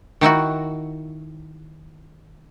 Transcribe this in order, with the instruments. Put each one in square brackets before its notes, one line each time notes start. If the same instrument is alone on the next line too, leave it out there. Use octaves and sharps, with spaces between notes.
[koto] D#3 D#4 E4 F#4